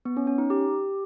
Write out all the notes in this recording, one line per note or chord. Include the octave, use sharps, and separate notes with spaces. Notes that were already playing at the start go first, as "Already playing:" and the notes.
B3
C#4
C#4
D#4
G4